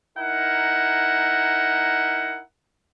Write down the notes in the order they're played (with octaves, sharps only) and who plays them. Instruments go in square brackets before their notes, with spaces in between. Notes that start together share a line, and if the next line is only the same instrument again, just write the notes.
[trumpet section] D#4 E4 A#4 F#5